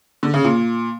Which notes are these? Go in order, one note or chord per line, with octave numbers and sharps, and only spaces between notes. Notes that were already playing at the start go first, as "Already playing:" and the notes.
D3
C#3
A#2